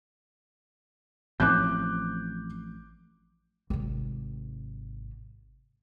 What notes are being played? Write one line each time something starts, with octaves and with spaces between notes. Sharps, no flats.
A1 F3 C4 D6 F#6 G6
G#1 C3